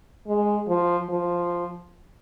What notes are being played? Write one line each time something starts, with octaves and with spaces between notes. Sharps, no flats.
G#3
F3
F3